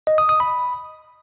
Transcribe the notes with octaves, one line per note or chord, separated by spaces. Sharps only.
D#5
D#6
D#6
B5